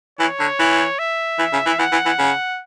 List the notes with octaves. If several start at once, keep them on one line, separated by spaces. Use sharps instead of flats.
E3 C#5
D3
E3
E5
E3
C#3
E3
E3 F#5
E3
E3
C#3